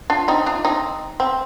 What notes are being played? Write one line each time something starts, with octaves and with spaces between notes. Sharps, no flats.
D4 F4
C4 D#4
D4 F4
C4 D#4
C4